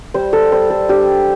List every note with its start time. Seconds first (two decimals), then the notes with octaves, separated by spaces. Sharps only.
0.14 G3 C5
0.33 A4
0.52 G3 C5
0.70 A4
0.89 D4 G4